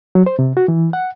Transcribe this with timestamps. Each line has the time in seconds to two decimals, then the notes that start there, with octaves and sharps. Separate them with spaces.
0.15 F#3
0.26 C5
0.39 C3
0.57 F#4
0.68 E3
0.93 F#5